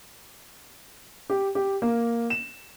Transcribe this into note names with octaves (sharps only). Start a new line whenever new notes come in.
G4
G4
A#3
E7